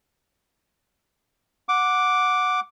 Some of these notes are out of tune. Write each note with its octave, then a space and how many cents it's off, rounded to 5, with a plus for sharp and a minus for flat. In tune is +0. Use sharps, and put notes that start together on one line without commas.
F#5 -10 D6 +0